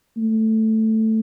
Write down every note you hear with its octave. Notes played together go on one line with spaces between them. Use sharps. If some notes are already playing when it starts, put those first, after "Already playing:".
A3